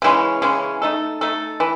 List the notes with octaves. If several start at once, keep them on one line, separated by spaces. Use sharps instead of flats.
C#3 E3 G#3 C#4
C#3 E3 G#3 C#4
A3 D#4 A4
A3 D#4 A4
E3